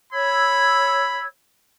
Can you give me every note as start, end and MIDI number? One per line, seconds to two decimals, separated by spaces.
0.13 1.25 73
0.13 1.25 83
0.13 1.25 88
0.13 1.25 92